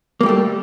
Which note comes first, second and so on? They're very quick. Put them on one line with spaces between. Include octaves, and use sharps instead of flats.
A#3 G3 G4 A3